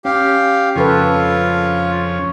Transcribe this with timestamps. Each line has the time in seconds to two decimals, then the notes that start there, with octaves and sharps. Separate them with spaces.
0.05 C#4 G4 F5
0.76 F2 C#3 C#4 F4 A4 B4